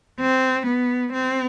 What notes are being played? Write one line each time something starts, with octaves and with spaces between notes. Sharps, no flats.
C4
B3
C4